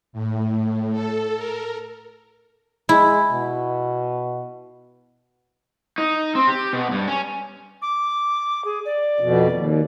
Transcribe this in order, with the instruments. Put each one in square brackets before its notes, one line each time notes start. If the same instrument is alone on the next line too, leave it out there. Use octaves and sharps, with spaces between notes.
[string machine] A2
A4
A#4
[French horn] G#3 [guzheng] E4
[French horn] B2
[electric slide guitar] D#4
C4
G4
B2
G2
C#4
[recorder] D6
G#4
D5
[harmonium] F2 B2
D#2